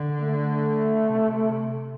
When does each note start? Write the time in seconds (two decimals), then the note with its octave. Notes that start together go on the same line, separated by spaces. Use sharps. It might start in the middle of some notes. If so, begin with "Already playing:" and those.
Already playing: D3
0.20 A3
1.04 C3